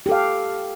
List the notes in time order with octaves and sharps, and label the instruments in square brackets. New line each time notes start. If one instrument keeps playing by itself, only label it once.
[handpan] G4
A4
F5